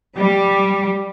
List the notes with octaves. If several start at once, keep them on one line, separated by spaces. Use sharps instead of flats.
G3